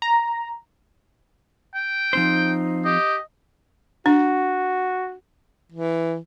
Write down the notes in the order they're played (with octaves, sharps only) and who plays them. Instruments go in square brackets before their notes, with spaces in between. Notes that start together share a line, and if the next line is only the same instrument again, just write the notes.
[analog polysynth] A#5
[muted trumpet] G5
[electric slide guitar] F3 C4 C5 [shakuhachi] D#4
[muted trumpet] G4 [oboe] D#5
[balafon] D4 [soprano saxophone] F#4
[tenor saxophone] E3